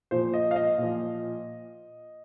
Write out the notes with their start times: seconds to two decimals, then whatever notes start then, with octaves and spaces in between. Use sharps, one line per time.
0.11 A#2 F3 C5
0.34 D#5
0.51 F5
0.56 D#5
0.78 A#2 F3